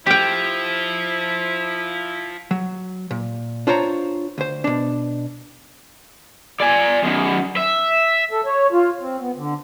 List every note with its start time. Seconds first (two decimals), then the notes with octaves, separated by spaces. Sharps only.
0.07 F3 E4 G4 G5 B6
2.51 F#3
3.11 A#2
3.67 D4 F4 C5 C#5 A#5
4.38 D2 C5
4.64 B2 D4
6.60 D5 G#5
7.04 F#2 D#3
7.57 E5
8.31 A4
8.46 C#5
8.72 F4
9.00 C4
9.20 B3
9.37 D3